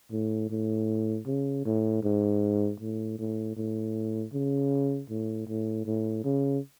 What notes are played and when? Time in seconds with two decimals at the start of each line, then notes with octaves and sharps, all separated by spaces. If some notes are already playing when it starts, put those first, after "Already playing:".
0.11 A2
0.50 A2
1.27 C#3
1.65 A2
2.03 G#2
2.80 A2
3.18 A2
3.56 A2
4.33 C#3
5.10 A2
5.48 A2
5.86 A2
6.24 C#3